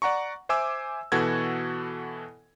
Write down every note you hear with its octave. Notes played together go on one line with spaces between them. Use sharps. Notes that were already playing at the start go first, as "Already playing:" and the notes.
D5 F#5 A#5 C#6
C5 E5 G#5 D6 E6
B2 E3 F#4 A4 G#6